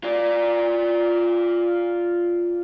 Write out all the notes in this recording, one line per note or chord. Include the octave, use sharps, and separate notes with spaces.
F4 D5